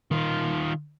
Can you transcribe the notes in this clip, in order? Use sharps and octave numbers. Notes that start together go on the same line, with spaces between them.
D#3 F4